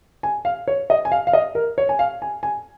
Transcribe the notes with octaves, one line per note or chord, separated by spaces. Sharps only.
G#5
F5
C#5
D#5
G#5
F5
F5
D#5
A#4
C#5
G#5
F5
G#5
G#5